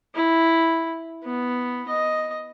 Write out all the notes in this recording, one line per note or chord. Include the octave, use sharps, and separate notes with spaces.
E4
B3
D#5